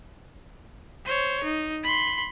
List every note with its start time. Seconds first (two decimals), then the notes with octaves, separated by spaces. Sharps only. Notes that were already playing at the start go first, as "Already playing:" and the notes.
1.05 C5 C#5
1.44 D#4
1.84 B5 C6